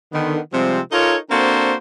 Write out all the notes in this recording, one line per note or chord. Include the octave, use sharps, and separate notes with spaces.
D3 D#3 B3
C3 F3 G3 G#3 C4
D#4 F4 A4 A#4 C#5
A#3 C4 D4 F#4 A4 C5